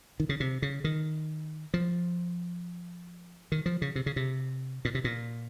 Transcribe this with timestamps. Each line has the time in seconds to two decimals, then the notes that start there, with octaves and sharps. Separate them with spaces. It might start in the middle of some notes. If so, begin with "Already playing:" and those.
0.20 D#3
0.29 C#3
0.40 C3
0.62 C#3
0.84 D#3
1.74 F3
3.52 D#3
3.66 F3
3.82 C#3
3.96 C3
4.06 C#3
4.16 C3
4.85 A#2
4.95 C3
5.04 A#2